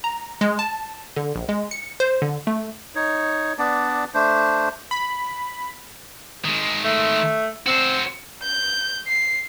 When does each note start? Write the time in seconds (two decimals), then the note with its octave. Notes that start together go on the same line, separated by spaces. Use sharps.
0.04 A#5
0.41 G#3
0.59 A5
1.16 D3
1.35 A#1
1.49 G#3
1.71 C#7
2.00 C5
2.22 D3
2.47 A3
2.95 D#4 C#5
3.58 B3 D4 D5
4.14 A3 D4 C5
4.91 B5
6.45 D#3 G#3
6.84 A3
7.67 C4 F#4 C5
8.43 G6
9.07 C7